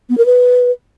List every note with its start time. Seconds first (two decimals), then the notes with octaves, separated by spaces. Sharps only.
0.09 B3
0.18 A#4
0.26 B4